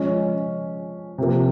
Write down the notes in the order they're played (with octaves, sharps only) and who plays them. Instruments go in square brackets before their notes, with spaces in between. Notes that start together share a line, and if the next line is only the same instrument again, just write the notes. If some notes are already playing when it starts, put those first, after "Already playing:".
Already playing: [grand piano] F3 G#3 C#4
C3 F3 A#3